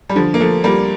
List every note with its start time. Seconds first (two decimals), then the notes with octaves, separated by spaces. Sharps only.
0.09 G3
0.15 D3 F3
0.34 A#3
0.40 F3 A3
0.64 G3 A#3